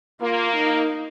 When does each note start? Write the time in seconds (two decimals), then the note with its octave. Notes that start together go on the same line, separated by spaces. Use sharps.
0.21 A#3 F4
0.56 D#4